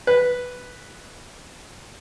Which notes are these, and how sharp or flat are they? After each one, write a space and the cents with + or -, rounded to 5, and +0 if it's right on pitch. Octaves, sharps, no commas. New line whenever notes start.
B4 +0